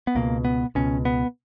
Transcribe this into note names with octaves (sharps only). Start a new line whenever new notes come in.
B3
C#2 B2 A#3
B3
C#2 B2 C#4
B3